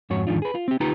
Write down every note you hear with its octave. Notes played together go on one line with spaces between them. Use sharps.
F2 G#2 F#4 C#5
E2 G#2 D#3 F3 D4 F4
G#4 B4
F4
C4 G4
D2 D#4 F4 G4 B4 A#5